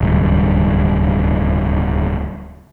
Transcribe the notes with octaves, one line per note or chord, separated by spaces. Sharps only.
D1 C#2 G2 D#3